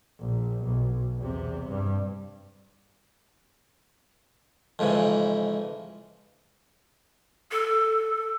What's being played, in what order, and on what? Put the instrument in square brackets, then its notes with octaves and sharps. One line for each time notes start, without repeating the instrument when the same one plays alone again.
[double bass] A#1
B1
E2 C3
G2
[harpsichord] F2 G#2 C#3 E3
[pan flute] A4